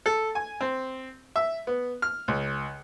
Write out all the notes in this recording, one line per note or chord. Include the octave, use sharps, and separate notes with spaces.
A4
G#5
C4
E5
B3
F6
C#2